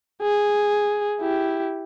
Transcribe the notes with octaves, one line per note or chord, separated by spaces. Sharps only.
G#4
E4 G4